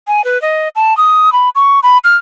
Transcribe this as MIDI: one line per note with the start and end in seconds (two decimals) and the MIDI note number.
0.07 0.24 80
0.24 0.40 71
0.42 0.68 75
0.76 0.96 81
0.97 1.32 87
1.32 1.49 83
1.55 1.80 85
1.83 1.98 83
2.04 2.16 89